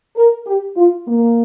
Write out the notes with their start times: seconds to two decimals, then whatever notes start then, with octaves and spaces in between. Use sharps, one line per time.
0.16 A#4
0.47 G4
0.76 F4
1.07 A#3